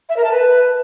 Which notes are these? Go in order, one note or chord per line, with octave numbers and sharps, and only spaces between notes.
E5
A#4
A5
B4